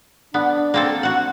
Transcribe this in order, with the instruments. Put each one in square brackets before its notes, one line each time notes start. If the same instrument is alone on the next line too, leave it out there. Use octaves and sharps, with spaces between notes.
[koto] B3 [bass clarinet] D4
[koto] A#3 C4 A4
F#4 F#5